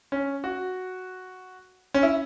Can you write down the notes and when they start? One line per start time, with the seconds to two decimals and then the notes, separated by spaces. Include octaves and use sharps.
0.12 C#4
0.44 F#4
1.94 C#4
2.03 E4